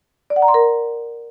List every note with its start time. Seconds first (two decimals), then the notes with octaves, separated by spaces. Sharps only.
0.30 D5
0.36 F#5
0.42 A#5
0.48 C6
0.54 A#4